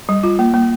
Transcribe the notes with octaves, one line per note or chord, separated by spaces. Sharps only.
G3
F4
A#3
A#3